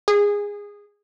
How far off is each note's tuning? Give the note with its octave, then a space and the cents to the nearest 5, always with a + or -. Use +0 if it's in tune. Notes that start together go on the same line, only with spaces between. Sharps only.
G#4 -20